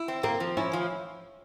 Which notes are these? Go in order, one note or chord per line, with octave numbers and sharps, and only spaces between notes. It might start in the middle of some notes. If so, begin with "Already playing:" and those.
Already playing: E4
C4
A#3 C4
F3
C#4 E4
F3